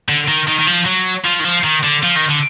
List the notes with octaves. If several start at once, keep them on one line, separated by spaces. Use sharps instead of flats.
D3
D#3
D#3
D#3
F3
F#3
F3
D#3
F3
D#3
D3
F3
D#3
D3